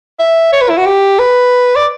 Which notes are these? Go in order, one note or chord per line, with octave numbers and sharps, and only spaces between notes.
E5
C#5
B4
E4
F#4
G4
B4
D5